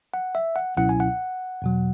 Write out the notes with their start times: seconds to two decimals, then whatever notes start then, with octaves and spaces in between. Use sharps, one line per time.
0.14 F#5
0.35 E5
0.56 F#5
0.77 C#2 B2 F#3 C#4 E4 F#5
0.89 G#5
1.00 F#5
1.62 E2 B2 F#3